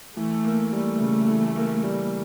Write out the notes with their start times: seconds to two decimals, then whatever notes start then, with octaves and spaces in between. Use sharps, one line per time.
0.16 E3 A3
0.44 A#3
0.72 G3 A3
1.00 C#3
1.28 E3
1.56 A#3
1.83 G3